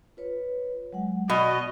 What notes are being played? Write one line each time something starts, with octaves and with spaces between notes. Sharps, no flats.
F4 B4 C#5
F#3 G#3 F#5
B2 F#4 D5 D#5 C#6